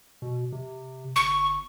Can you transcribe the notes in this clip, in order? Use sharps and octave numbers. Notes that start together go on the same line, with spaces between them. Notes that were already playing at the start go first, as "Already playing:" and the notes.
B2
C3
G1 C#6